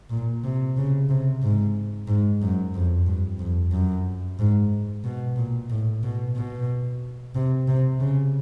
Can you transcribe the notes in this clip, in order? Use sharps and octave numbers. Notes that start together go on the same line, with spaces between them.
A#2
C3
C#3
C3
G#2
G#2
F#2
F2
G2
F2
F#2
G#2
B2
A#2
A2
B2
B2
C3
C3
C#3